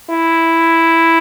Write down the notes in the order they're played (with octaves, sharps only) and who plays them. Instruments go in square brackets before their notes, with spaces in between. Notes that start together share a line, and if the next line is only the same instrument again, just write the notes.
[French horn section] E4